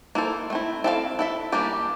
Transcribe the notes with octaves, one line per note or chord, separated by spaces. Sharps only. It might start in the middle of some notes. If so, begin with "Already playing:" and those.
A#3 E4 A4 C5
A3 C4 E4
C4 E4 A4 C5 F5
E4 A4 E5
E3 G3 A#3 D4 G4